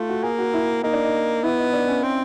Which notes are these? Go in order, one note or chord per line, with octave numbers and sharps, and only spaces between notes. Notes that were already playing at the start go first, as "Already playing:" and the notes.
Already playing: A3 F4
F#4
A#3 G#4
F#4
E4
A#3 D#4
D4
D#4
B3 E4
D#4
D4
C#4
C4